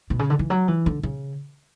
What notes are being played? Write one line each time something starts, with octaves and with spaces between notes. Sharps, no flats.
B2
C#3
D3
E3
F#3
E3
D3
C#3